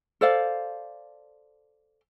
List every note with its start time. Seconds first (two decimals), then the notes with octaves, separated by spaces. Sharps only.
0.21 A4 C5 D5 F5